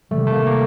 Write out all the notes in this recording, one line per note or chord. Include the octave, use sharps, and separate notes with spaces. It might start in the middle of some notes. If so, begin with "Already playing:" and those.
C3 D#3 G3 A3
A3
A#3
A#3